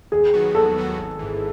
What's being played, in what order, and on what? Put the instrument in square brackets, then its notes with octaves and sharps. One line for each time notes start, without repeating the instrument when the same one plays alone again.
[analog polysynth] D#2 [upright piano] G#4
[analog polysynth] D#3 F#3 B3 F#4
[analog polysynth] D#2 [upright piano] A4
[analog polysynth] D#3 F#3 B3 F#4
G#1
G#2 E3